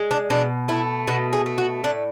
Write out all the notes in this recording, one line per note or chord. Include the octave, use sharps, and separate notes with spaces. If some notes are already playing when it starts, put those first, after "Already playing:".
Already playing: G#3
D4
B2 D4
A3 E4
B2 F#4
G#4
A3
F#4
A2 D4